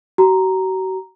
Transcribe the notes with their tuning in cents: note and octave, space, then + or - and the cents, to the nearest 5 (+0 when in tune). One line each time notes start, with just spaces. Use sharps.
F#4 +40 A#5 +0